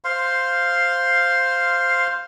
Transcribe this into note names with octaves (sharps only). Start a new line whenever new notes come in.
C5 F5 C6